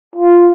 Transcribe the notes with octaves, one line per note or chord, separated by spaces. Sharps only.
F4